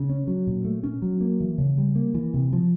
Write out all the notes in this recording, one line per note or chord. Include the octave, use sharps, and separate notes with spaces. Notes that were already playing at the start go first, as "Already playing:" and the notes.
Already playing: C#3
C#4
F#3
A#2
A3
C#4
F#3
A#3
E3
C#3
G3
A#3
E3
C3
F3